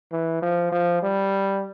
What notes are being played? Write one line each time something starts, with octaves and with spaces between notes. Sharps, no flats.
E3
F3
F3
G3